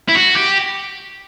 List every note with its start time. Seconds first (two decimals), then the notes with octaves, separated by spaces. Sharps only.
0.09 E4
0.16 F#4
0.37 G4